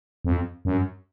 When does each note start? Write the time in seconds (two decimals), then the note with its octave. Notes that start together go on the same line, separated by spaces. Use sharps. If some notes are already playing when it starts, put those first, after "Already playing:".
0.25 F2
0.65 F#2